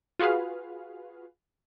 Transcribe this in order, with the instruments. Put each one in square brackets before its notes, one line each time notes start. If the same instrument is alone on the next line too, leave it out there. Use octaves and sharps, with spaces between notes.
[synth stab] F4 F#4 G#4 B4 F5